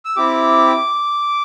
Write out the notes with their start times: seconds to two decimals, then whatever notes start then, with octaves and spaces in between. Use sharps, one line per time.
0.05 E6
0.16 C4 E4 G4 D6